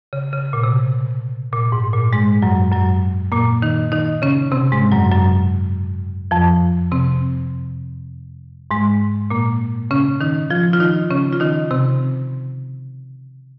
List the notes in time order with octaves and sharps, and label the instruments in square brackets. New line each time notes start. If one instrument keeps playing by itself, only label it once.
[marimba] C#3
C#3
A#2
C3
A#2
G#2
A#2
G#2 G#3
F#2 F#3
F#2 F#3
A#2 A#3
D#3 D#4
D#3 D#4
C#3 C#4
C3 C4
G#2 G#3
F#2 F#3
F#2 F#3
F2 F3
C3 C4
G#2 G#3
A#2 A#3
C#3 C#4
D#3 D#4
F3 F4
F4
D#3 D#4
C#3 C#4
F4
D#3 D#4
C3 C4